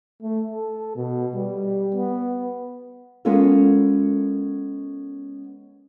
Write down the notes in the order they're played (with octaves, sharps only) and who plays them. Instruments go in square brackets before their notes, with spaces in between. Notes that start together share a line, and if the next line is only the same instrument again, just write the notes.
[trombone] A3
A4
B2
G3
B3
[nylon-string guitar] G#3 B3 C#4 F4 A4 A#4